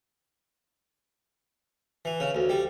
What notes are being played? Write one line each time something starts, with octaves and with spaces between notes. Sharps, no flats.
E3
C#3
D2
G3